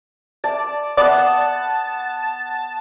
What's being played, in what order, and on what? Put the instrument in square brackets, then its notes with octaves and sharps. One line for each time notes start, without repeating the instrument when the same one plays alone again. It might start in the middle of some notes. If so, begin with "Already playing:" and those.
[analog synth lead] D5 [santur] A5
[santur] B3 F#5 [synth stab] D5 [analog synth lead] A5